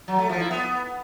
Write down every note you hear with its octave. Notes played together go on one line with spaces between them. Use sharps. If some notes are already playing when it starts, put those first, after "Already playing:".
F#3
A3
F3
E4
B3